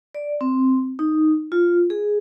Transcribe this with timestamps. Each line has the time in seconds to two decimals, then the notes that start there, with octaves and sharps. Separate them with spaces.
0.15 D5
0.41 C4
0.99 D#4
1.52 F4
1.90 G#4